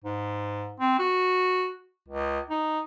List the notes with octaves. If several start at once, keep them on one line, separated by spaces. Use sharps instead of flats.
G#2
C4
F#4
C#2
D#4